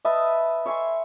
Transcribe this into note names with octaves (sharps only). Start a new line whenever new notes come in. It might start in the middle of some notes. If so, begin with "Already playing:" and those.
B4 D#5 E5 A5
C#5 E5 G#5 C6